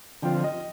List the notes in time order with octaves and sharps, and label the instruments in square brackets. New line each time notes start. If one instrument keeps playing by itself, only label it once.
[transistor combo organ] D3 F3 C4 F4 [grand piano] G5
[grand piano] D#5